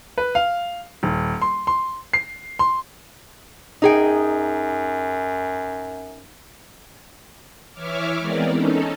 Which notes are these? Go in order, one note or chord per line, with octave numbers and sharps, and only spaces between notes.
B4
F5
D#1
C6
C6
C7
C6
F#2 D#4 G#4 G5
E3 C#5 E5 D6 F6
E3 G#3 B3 C4 A#4 D5
C#4 D#4 A4